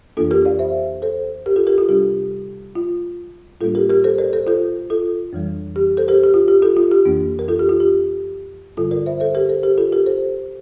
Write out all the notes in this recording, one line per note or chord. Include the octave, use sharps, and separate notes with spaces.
F2 E3 A#3 D4 F4 A4
G4 A#4
D5 F5
C5 E5
A4 C5
G4 A#4
F4 A4
G4 A#4
F4 A4
C3 G3 D4 G4
F4
A2 G3 A#3 D4 F4 A4
G4 A#4
G4 A#4
A4 C5
A#4 D5
A4 C5
F4 A4
F4 A4
F2 E3 G3
G4
A4 C5
G4 A#4
G4
F4
G4
F4 A4
F4
G4
F2 E3 A#3 D4
A#4
F4 A4
G4
F4
G4
G2 D3 G3 F4 A4
A#4 D5
C5 E5
A4 C5
G4 A#4
A4 C5
G4 A#4
F4 A4
G4 A#4
A4 C5